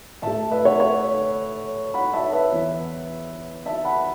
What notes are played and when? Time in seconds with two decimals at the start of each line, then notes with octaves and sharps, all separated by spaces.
0.22 A2 A3 E5 A5
0.51 B4 E5
0.65 C#5 F#5
0.80 C#5 F#5
1.94 F#5 B5
2.13 E5 A5
2.32 B4 E5
2.52 E2 E3 B3
3.66 E5 A5
3.85 F#5 B5